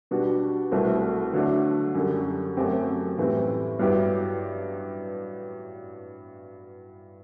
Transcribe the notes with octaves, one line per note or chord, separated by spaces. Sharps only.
B2 G3 D4 F#4
C2 B2 A3 C4
D3 F#3 A3 D4
F#2 D3 G3
F#2 F#3 A3 C4 G4
A2 E3 G3 C4
G2 F#3 B3 E4 G4